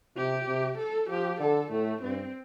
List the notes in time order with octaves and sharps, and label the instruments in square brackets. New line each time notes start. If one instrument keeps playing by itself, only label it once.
[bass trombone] C3 [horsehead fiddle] G4
[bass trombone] C3
[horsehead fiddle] A4
[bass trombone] F3 [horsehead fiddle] G4
[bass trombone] D3 [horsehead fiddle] A4
[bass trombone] A2 [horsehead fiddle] A3
[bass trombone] G2 [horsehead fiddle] C4